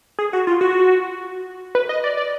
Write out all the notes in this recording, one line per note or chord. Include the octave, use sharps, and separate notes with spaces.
G#4
F#4
F4
F#4
B4
D#5
D5
D5